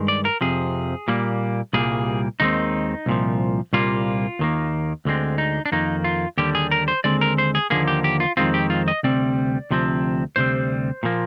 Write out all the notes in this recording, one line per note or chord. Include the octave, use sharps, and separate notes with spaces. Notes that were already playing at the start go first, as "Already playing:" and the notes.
Already playing: G2 D#3 G#3
D5
A#4
F2 C3 F3 G#4
A#2 G3 A#3
C2 A#2 G3 A#3 G#4
D#2 D#3 G#3 C4 D#4
C2 A#2 F3
C2 A#2 G3 A#3 F4
D#2 D#3 A#3
D2 D3 G#3 C4
D#4
D4
F2 D#3 A#3 D#4
F4
D#2 D3 G3 G4
G#4
A#4
C5
D#2 D3 G#3 C4 D5
A#4
C5
G#4
D#2 D3 F3 A#3 G#4
G4
G4
F4
F2 D#3 G#3 C4 F4
G4
F4
D#5
D2 C3 G3 C4 D5
D2 C3 F3 C4
D2 C3 G3 C4 C5
A#2 F3 A#3